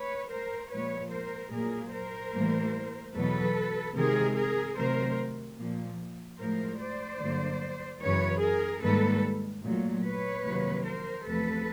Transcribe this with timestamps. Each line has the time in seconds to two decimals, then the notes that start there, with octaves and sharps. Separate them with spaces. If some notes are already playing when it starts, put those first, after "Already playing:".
Already playing: B4 C#5
0.31 A#4 C5
0.71 A#2 F3 G#3 B4 C#5
1.12 A#4 C5
1.53 A#2 F#3 A#3 G#4 A#4
1.93 A#4 C5
2.34 A2 E3 G3 A#3
3.15 E2 B2 F#3 A4 B4
3.96 C3 D#3 G#3 G#4 A#4
4.37 G#4 A#4
4.77 C3 D#3 F#3 A3 A#4 C5
5.58 A#2 F3 A#3
6.39 A2 F3 G#3 A#4 C5
6.80 C5 D5
7.20 G2 D3 F#3 A#3
8.01 F#2 C#3 E3 B4 C#5
8.42 G#4 A#4
8.82 G#2 D#3 G3 A#3 A4 B4
9.63 A#2 F#3 A3
10.04 B4 C#5
10.45 F2 C3 D#3 F#3 A#3
10.85 A#4 C5
11.25 E2 C3 F3 A3 A4 B4